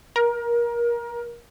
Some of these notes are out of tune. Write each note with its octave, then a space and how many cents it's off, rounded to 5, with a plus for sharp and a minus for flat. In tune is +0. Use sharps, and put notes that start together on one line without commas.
A#4 +25